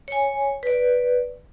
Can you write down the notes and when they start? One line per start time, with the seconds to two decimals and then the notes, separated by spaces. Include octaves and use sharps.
0.08 C#5 G#5
0.63 B4 D5